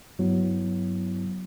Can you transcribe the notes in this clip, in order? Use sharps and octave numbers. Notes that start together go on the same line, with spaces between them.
G2 F#3 B3 E4